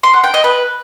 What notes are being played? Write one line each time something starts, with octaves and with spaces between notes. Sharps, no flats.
C6
F#5
G5
D#5
B4